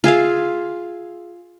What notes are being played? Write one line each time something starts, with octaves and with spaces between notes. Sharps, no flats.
F4 G#4 E5 F5